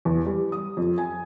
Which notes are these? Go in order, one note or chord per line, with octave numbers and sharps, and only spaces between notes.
E2
G3
D#6
F2
G#5